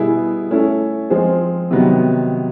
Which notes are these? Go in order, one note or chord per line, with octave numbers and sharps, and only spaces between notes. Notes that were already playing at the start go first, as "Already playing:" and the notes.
Already playing: B2 G3 B3 E4 G#4
A3 C#4 E4 A4
F3 G#3 C4 F4 G#4
C3 D#3 F#3 B3